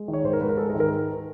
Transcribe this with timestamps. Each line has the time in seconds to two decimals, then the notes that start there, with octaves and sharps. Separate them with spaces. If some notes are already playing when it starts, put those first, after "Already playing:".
Already playing: G#3
0.08 D#3
0.13 C#5
0.24 G#2 C5
0.33 A#4
0.41 G#2 B4
0.49 A#4
0.57 G#3 A4
0.70 A#4
0.74 D#3
0.80 A#4